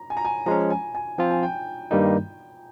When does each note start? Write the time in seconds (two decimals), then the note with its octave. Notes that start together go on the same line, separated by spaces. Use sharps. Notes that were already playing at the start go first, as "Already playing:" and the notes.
Already playing: A#5
0.10 G#5
0.17 A#5
0.25 G#5
0.46 F3 G#3 C#4 A#5
0.70 G#5
0.95 G#5
1.18 F3 C4 F4 G5
1.31 G#5
1.43 G5
1.91 G2 D#3 G3 A#3 D#4